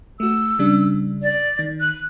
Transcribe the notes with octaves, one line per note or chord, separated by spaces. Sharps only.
A3 F#4 E6
C#3 G3 D4
D5
D#3
F#6